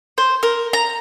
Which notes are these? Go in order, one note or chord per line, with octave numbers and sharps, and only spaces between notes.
C5
A#4
A#5